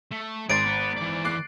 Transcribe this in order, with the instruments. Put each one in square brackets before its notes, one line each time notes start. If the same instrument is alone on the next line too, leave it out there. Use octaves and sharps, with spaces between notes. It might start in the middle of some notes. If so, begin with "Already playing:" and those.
[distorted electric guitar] A3
[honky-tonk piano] G#1 [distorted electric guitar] G#4 C6 [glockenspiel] A6 D7
[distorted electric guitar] B3
E3 D5
[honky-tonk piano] D6 F#6 C7